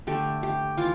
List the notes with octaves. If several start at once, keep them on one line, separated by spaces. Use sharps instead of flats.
D3 A3 G4
G4
E3 F4